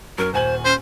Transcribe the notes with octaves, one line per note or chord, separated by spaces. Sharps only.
F#2 F#3 A#4
D#1 C5 G#5 F#7
C#4 C5